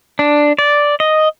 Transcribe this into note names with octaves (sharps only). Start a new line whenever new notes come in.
D4
D5
D#5